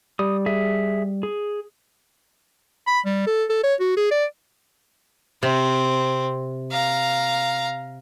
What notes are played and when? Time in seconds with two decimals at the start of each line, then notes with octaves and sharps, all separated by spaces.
0.19 G3 D#6
0.46 G#4 E5
1.23 G#4
2.87 B5
3.05 G3
3.27 A4
3.49 A4
3.64 C#5
3.80 F#4
3.97 G#4
4.11 D5
5.43 C3 C4
6.72 F5 A#5